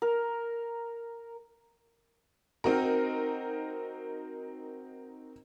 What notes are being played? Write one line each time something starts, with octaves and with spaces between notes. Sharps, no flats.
A#4
C4 D#4 F#4 A#4